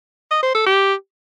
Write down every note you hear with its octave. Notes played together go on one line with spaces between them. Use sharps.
D#5
C5
A4
G4